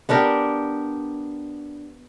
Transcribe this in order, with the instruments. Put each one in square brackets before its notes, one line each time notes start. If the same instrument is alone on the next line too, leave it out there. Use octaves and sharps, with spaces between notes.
[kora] B3 D4 G4 A#4